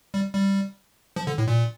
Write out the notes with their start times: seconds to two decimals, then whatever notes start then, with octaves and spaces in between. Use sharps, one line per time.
0.14 G3
0.35 G3
1.16 F3
1.27 D3
1.38 A2
1.48 A#2